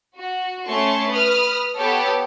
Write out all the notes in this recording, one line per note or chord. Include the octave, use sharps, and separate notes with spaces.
F#4
A3 C#4 A5 C6 C#6
B4 D#6 F6
B3 G4 A4 C#5